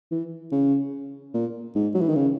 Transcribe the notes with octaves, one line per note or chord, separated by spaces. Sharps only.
E3
C#3
A#2
G#2
F#3
E3
D#3
C#3